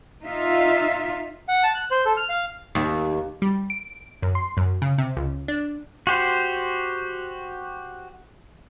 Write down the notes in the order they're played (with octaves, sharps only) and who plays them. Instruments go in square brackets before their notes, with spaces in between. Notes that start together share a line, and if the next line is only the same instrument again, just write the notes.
[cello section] D#4 F4 E5
[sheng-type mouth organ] F#5
A5
F#6
C5
A4
F6
F5
[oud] D#2
[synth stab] G3
D7
F#2
C6
F#2
C#3
C3
C#2
D4
[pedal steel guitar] F#4 G4 C5